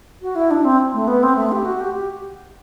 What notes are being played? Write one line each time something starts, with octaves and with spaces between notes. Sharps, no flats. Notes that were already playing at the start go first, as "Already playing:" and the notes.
F#4
E4
D4
C4
A3
B3
C4
A3
G4
F#4
G4
G4